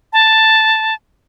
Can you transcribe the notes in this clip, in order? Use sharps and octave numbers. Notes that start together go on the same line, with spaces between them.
A5